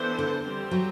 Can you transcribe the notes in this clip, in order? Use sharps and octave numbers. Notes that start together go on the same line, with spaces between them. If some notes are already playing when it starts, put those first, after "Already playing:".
Already playing: E3 B3 D4 A4 C5
D3
G3 C4 G4 C5
F#3